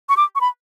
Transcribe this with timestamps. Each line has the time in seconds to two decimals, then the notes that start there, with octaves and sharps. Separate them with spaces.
0.09 C#6
0.17 D6
0.35 C#6
0.41 B5